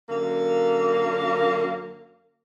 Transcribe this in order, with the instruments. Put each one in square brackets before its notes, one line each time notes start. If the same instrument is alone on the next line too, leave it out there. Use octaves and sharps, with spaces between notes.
[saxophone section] F#2 D3 A#3